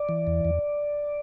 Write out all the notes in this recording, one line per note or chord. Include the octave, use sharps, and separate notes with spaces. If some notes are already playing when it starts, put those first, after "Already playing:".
Already playing: D5
E3
E2
E2